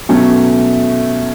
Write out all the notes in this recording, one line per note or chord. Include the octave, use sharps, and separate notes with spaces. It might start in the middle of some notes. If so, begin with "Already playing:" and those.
B2 F#3 A3 C#4